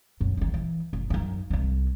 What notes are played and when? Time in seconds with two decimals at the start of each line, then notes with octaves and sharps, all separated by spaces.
0.21 F#2
0.37 D3 D#3
0.54 E3
0.93 F#1
1.10 F#2 D#4
1.50 C2 G#3